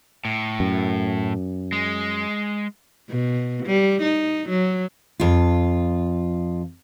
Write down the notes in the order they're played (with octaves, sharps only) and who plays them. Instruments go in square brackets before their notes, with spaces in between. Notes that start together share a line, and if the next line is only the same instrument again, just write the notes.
[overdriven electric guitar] A2
[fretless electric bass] F#2
[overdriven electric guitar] G#3
[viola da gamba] B2
G3
D#4
F#3
[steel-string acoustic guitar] F2 F4